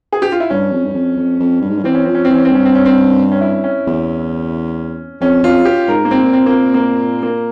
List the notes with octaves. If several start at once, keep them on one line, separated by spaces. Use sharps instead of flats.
G#4
G4
F4
E4
G2 C#4
F2
G2
F2
F2
F2
G2
G#2
G2
E3 C4
C#4
F3 C4
C#4
C4
E3
C#4
C4
G2 C#4
C4
C#4
C4
C#4
E4
C#4
E2
F2 C#4
F2 F4
G4
G#2 A#4
A#3
C4
A#2
C4
A#3
A#3
A#3